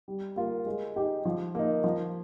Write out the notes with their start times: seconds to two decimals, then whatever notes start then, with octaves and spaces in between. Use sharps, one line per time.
0.08 G3
0.36 A#3 F4 A#4
0.66 G#3
0.96 D#4 G4
1.25 F3
1.55 A#3 D#4
1.84 F3